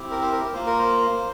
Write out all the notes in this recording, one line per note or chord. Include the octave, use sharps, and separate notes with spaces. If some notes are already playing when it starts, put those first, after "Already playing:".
Already playing: C4 E4 G4
A#4
C5
A#4
A#3 F4 C5
A#4
C5